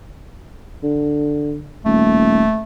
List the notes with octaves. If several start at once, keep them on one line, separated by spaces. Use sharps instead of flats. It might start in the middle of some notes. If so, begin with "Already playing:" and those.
D3
D#1 A3